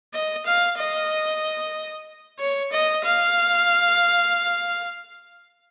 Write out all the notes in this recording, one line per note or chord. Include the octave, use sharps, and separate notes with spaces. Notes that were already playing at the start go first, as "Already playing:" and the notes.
D#5
F5
D#5
C#5
D#5
F5